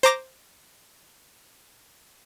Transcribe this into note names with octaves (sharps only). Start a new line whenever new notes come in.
C5 A#5 D6 A#6